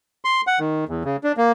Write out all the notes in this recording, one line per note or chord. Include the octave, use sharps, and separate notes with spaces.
C6
F#5
D#3
E2
C#3
D4
A#3